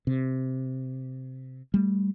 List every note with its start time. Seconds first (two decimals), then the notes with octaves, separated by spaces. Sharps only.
0.07 C3
1.74 G3 A3